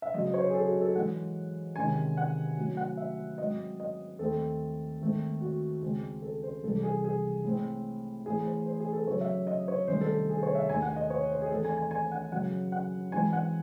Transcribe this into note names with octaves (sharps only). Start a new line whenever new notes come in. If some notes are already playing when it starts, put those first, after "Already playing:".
E5
F#2 C#3 F#3 D#5
D#5
C#5
C5
G#4
A4
F#4
A4
G#2 E3 G#3 F#5
C3 D#3 G#3 C#4 G#5
F#5
A2 F#3 C#4
F#5
E5
G#2 F#3 C4 D#5
D#5
D#2 D#3 A3 C4 A4
G#2 D#3 A3 C4
F#4
C#2 C#3 G#3 C4
A4
C5
C2 C3 E3 A4
G#4
G#4
A2 G#3 C4
A2 E3 A3 G#4
C5
C5
G#4
A4
F#2 C#3 F#3 C#5
E5
D#5
C#5
C2 C3 D#3 A3 C#4 C5
A4
G#4
C#5
E5
D#2 D#3 A3 G#5
F#5
D#5
C#5
C5
G#4
A2 E3 C4 A4
G#5
G#5
G#5
F#5
F#2 C#3 F#3 F#5
F#5
G#2 E3 G#3 C4 G#5
F#5